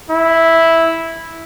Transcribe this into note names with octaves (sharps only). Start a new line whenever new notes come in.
E4